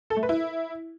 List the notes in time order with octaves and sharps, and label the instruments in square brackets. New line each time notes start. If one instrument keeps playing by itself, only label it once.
[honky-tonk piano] A4
A3
B4
E4